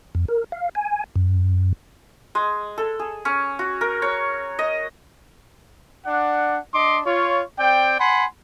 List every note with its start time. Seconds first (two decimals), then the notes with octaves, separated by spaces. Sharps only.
0.15 F2
0.28 A#4
0.52 F5
0.75 G#5
1.16 F#2
2.35 G#3
2.78 A4
2.99 G#4
3.25 C#4
3.59 F#4
3.81 A#4
4.02 C#5
4.59 D#5
6.06 D4 D5 F#5
6.73 D4 D#5 C6 D6
7.05 F4 C#5
7.58 C4 D5 G5
7.99 F#5 G#5 B5 C6